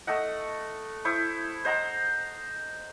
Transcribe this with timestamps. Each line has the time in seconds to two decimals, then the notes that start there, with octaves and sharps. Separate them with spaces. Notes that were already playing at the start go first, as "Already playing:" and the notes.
0.07 A3 D#5 F#5
1.05 E4 C5 C#6 D#6
1.65 C5 D#5 F#5 A#5